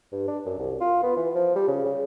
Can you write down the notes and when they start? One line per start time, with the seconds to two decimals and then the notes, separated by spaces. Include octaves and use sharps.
0.12 G2
0.28 D4
0.45 F#2
0.58 C2
0.80 F4
1.03 B3
1.17 E3
1.35 F3
1.55 G3
1.68 C#3
1.85 C#3